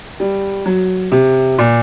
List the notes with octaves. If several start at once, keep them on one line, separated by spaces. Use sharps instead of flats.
G3
F#3
C3
A#2